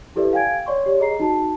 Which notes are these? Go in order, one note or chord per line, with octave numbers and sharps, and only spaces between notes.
E4 G4 A4 B4 D5 E5
F5 G5 G#5 G#6 D7
C#5 D5 C6 C#6
G4 C#5
G#4 D#5 A#5 C7
D#4 F#4 A5